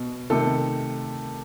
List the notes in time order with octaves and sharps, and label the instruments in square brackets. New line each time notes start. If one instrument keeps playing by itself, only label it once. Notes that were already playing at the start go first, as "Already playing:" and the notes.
Already playing: [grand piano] B2
C3 D#3 A3 A4